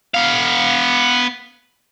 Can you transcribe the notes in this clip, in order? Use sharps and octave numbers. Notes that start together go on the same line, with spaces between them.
B3 F5